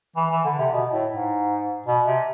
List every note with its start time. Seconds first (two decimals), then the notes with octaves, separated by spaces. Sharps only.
0.16 E3
0.30 E3
0.45 D3
0.59 C3
0.73 B2
0.92 A2
1.11 G#2
1.86 B2
2.05 C3